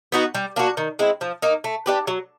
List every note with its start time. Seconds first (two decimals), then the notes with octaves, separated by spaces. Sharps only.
0.12 B3 D#4 F#4
0.35 G3
0.56 A#3 D4 F#4
0.77 D#3
0.99 G#3 C4 E4
1.21 F3
1.42 A#3 D#4
1.64 A3
1.86 D4 G4 B4
2.07 F#3